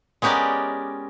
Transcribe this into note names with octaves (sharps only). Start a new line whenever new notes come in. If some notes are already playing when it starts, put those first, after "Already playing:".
G#3 B3 C#4 G4 A#4 D5